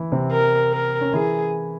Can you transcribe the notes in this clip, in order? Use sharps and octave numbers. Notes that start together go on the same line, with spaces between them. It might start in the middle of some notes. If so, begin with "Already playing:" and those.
Already playing: E3 E4
C3 C4
A#4
A#4
C#4
E3 E4 G#4